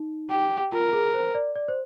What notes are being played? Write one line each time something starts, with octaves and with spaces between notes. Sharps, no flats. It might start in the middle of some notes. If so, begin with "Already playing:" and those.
Already playing: D#4
G4
F4 A#4
G#4
C5
D5
D5
C5